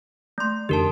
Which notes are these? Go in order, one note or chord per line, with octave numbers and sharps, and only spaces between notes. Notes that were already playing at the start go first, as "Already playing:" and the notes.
A3 C6
F2 D3 D#3 G4 A#4 A5